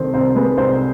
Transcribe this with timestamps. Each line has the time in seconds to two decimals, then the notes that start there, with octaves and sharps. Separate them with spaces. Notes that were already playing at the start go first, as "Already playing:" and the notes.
Already playing: C2 D#3 A4 C5
0.14 C2 C5
0.36 G#3 B4
0.57 C2 C5